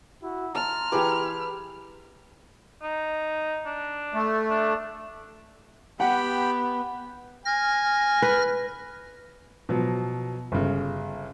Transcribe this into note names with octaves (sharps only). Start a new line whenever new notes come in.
E4 F#4
E5 A5 A#5 C6 F6
E3 G4 G#4 B4 D6
D#4
D4
A3
D4
B3 G4 F#5 G5 B5
G#5 F6 A#6
B4
B2 F3 F#3
G1 C#3